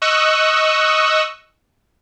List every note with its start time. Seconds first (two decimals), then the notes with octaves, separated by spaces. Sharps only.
0.02 D#5 C#6 D#6 E6 F#6